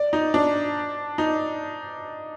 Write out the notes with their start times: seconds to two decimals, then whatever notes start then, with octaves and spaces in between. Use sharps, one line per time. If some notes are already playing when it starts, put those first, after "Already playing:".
Already playing: D5
0.13 D#4
0.34 D4
1.18 D#4